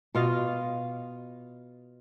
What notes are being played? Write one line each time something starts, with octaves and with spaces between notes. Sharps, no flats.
B2 F4 D#5 F5